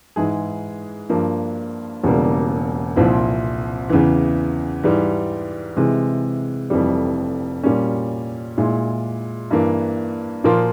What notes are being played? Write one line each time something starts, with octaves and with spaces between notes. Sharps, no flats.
G#2 E3 G#3 E4 G#4
G2 F3 A#3
E1 E2 C#3 G3 A#3
C2 A#2 F3 C4 E4
E2 C#3 E3
G#2 E3 G3
C3 E3 G#3
F1 F2 E3 G3
A#2 G3 A#3 C#4
A#2 G#3 E4
G2 E3 A#3
A#2 F3 A#3 F4 A#4